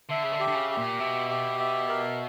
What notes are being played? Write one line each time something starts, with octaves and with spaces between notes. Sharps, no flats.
D3 E5
C#3
D3
G4
D3
C#3
G4
A#2
B2 E5
G4
E5
A#4